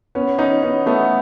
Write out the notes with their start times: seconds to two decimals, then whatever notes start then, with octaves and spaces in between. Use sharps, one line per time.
0.15 B3 C#4
0.39 C#4 D#4
0.63 B3 C#4
0.86 A3 B3